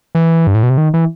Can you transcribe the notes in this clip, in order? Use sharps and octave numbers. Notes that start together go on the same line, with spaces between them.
E3
G2
A2
B2
C3
D#3
E3